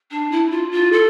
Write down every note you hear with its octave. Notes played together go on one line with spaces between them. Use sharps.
D4
E4
F4
F4
A4